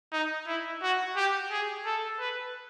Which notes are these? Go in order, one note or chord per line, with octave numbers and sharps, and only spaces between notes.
D#4
E4
F#4
G4
G#4
A4
B4